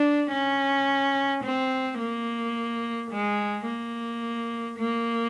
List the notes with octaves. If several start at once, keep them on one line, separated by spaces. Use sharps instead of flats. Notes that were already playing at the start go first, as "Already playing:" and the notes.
Already playing: D4
C#4
C4
A#3
G#3
A#3
A#3